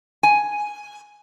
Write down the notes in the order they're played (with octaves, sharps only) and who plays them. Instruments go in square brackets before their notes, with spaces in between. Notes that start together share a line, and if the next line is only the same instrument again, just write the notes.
[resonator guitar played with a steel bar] G#5